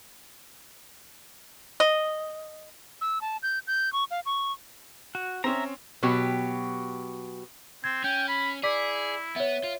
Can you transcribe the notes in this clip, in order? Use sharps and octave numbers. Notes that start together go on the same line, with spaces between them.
D#5
E6
A5
G6
G6
C#6
F5
C#6
F#4
C4 C#4 E5 A#5
B2 F#3 B3 G4
C4 G#6
C#4 G5
B5
E4 G#4 D5 D6 B6
B3 C#5 E5
F4